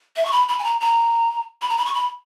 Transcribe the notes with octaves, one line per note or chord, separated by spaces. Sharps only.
E5
C#6
B5
B5
G#5
A#5
A#5
B5
A#5
B5
C#6
B5